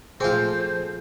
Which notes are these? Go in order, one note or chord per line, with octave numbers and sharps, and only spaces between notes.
A#2 F3 A3 C4 F4 G#4 C5 G#5